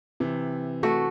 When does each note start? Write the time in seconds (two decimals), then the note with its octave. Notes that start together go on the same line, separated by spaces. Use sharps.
0.20 C3 E3
0.83 A3 F#4